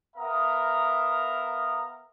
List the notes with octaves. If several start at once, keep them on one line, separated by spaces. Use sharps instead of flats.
B3 A#4 E5 F5 A#5 D#6